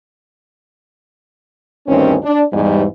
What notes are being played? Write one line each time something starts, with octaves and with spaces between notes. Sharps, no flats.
D2 G2 D#3 C4 C#4
D4
E2 G#2 G3